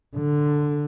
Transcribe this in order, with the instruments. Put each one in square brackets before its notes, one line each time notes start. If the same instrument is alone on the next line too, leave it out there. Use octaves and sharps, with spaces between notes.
[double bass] D3